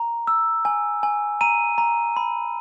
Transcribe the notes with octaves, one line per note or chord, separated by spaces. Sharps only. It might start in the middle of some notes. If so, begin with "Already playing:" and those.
Already playing: A#5
E6
G#5
G#5
A#5 D#7
A#5
B5